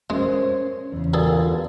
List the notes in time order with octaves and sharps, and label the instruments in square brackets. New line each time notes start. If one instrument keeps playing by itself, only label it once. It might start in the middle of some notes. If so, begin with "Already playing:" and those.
[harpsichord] G#3 [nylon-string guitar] C#4 A#4 C5
[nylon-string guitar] E2 C#3
[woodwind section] G2 A#2 D3 [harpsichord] G#4 A4